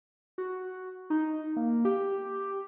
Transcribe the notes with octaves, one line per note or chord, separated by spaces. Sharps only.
F#4
D#4
A#3
G4